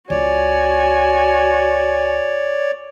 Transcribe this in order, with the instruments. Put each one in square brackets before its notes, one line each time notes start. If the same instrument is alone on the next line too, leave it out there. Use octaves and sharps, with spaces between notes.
[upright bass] C#2 F4 [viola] F#4 G#5 [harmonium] C#5 D5